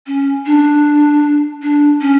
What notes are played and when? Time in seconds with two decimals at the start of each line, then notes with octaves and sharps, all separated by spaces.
0.07 C#4
0.46 D4
1.62 D4
2.01 C#4